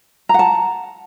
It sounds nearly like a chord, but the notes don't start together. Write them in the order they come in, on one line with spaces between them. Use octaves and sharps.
A#5 F#5 A5